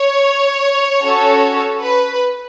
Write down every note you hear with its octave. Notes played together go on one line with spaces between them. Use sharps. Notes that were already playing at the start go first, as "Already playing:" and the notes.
Already playing: C#5
C#4 F#4 A4
B4